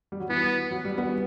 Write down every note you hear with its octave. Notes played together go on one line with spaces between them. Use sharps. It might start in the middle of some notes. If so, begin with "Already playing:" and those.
G3
F#3
E3 B3
F#3
G3
B3